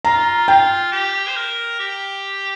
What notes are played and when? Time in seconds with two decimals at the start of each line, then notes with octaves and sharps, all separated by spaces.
0.05 F4 A#5
0.48 F4 G5
0.92 G4
1.27 C5
1.35 A#4
1.79 G4